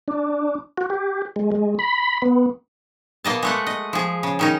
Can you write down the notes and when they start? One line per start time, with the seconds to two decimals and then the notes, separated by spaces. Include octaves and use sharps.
0.08 D4
0.78 F#4
0.90 G4
1.36 G#3
1.52 G#3
1.79 B5
2.22 B3
3.24 B2 A#3 D#5 A5
3.43 G#3 A3 F#5
3.67 D#5
3.93 F3 G#4
4.23 C#3
4.39 D#3 C#4 D#4